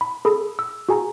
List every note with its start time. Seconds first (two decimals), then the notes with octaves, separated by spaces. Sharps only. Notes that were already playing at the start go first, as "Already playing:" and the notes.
0.01 B5
0.25 G#4 A4 B5
0.59 E6
0.89 F#4 G#4 G#5 A#5